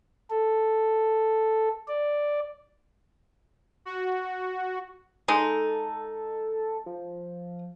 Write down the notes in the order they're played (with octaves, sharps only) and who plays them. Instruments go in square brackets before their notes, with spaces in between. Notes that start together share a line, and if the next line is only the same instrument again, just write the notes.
[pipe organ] A4
D5
[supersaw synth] F#4
[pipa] G#3 D#4 [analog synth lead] A4
[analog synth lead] F3